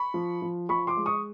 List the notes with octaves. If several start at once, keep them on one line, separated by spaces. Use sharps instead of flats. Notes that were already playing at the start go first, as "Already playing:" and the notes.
Already playing: B5 C#6
F3
F3
F3 B5 C#6
C6 D6
G#3
C#6 D#6